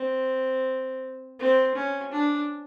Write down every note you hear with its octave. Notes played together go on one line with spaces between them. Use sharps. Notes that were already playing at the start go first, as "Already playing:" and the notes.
Already playing: C4
C4
C#4
D4